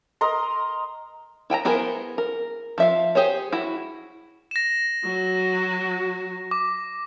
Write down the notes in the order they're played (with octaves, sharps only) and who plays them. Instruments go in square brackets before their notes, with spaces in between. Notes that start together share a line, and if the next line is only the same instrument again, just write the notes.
[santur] A#4 D#5 A#5 C6
[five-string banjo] E4 G5 G#5 A#5
B3 E4 G#4 A#4 C5
A#4
F3 E5 F5
G4 G#4 C5 C#5
E4 F#4
[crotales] A#6 E7
[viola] F#3 F#4
[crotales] D6